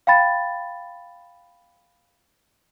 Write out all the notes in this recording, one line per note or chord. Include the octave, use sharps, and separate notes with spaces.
F5 G5 B5 A6